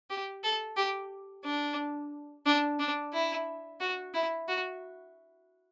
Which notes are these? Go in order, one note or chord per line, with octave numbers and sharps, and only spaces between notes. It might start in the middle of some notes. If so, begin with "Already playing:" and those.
G4
A4
G4
D4
D4
D4
E4
F#4
E4
F#4